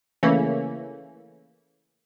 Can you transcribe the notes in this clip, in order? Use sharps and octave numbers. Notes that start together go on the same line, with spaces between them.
C#3 E3 A3 A#3 C#4